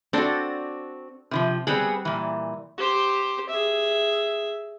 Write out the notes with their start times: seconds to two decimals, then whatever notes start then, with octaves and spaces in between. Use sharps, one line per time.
0.13 C4 D4 F#4 A4 C5
1.31 C3 E3 F3
1.67 G3 B3 C4 G#4 F#5 B5
2.05 A#2 E3
2.78 G4 C5
3.49 G#4 E5